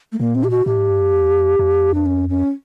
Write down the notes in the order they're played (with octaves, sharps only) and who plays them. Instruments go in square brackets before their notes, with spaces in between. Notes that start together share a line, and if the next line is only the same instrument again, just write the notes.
[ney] A3
[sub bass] A#2 [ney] A#3
[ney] C4
G4
F#4
[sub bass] A2 [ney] G4
[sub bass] G#2
G2
F#2
F2
E2
F2
F2
[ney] D4
C#4
C#4